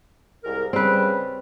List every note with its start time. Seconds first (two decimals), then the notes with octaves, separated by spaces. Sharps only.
0.43 C2 G#2 A#4
0.73 C#3 G3 C4 B4